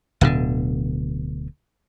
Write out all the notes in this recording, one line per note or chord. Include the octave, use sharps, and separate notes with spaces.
D1 B2 D3